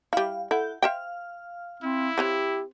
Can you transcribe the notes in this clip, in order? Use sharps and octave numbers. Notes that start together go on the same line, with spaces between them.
G3 E4 F5
E4 A4 F#5 G6
C5 E5 F5 G5 F6
C4 E4
C4 G4 B4 C#5